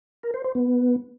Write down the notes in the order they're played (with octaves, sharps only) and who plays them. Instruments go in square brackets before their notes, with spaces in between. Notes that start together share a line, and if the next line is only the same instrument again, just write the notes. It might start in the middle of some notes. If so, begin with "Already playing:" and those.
[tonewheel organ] A#4
C5
C5
B3